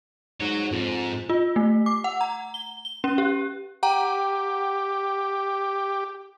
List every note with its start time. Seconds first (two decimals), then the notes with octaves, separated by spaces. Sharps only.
0.41 G#2 F#4 C#5
0.72 F2 G#2
1.29 F4
1.56 A3
1.86 D6
2.04 F#5
2.21 A#5
2.54 G7
2.85 G7
3.04 C#4
3.18 G4
3.83 G4 F#5 G5 A#5